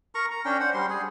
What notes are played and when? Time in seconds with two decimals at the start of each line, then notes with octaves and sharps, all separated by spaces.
0.15 A#4 A#5 C#6
0.31 A#5
0.45 C#4 D4 G5
0.60 C5 F#5
0.74 G3 C6
0.90 G#4